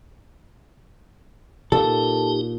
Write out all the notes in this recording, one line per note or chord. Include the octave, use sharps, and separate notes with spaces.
A#2 D#4 G4 A4